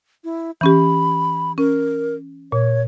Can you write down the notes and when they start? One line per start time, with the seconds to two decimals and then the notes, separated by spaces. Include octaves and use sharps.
0.24 E4
0.61 E3 C#4 G4 B5
1.58 C#4 A#4
2.52 A#2 C#5